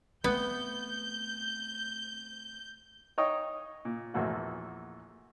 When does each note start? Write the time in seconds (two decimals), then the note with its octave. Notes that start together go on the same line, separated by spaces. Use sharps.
0.24 A3 B3 C4 G6
3.18 D#4 C#5 D#5 G5 C#6 D#6
3.85 A#2
4.14 A#1 E2 A3 A#3 F#4